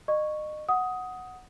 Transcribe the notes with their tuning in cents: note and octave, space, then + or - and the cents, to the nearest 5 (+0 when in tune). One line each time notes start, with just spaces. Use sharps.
D#5 -35 C#6 +0
F#5 +0 D#6 +10